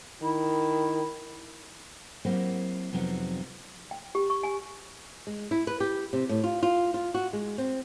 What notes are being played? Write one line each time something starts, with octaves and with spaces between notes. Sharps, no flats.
D#3 E4
F#3 A#3 C4 E4 G4
F2 C3 F3 F#3 B3 D#4
G5
G4
C#6
G#5
G#3
E4
B4
G4
C3
A2
F4
F4
F4
F#4
G#3
C4